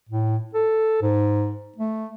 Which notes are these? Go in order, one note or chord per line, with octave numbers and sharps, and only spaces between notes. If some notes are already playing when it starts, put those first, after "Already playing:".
A2
A4
G#2
A3